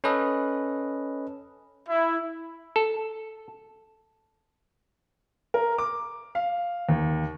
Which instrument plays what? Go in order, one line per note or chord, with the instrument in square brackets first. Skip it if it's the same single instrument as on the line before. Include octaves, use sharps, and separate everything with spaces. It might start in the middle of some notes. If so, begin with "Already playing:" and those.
[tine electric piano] C#4 A4 B4 D#5
[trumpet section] E4
[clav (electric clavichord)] A4
[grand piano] A#4
D6
F5
D#2